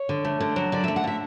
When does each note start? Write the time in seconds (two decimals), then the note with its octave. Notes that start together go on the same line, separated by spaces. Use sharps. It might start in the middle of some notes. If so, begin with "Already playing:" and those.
Already playing: C#5
0.09 D3
0.25 A3
0.41 D3
0.56 F#3
0.72 D3 D5
0.84 E5
0.88 A3
0.96 F#5
1.04 D3 E5